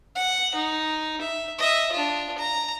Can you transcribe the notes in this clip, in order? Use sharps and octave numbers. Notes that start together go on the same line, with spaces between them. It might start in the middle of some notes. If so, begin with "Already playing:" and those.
F#5
D#4
E5
D#5 E5
D4 F4
A#5